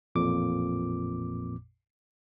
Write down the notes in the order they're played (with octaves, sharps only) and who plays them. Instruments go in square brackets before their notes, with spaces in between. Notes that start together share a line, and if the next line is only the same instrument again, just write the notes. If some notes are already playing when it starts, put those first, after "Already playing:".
[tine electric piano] A1 F2 A#2 D6